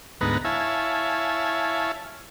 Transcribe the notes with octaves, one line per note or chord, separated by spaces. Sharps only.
D2 G#2 B3 D#4 B4 A#5
E4 C#5 E5 F5 G#5 A5